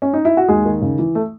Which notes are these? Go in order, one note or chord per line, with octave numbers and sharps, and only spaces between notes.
C#4
D#4
E4
F#4
D#2 G#3 G#4
D#3
C#3
E3
A3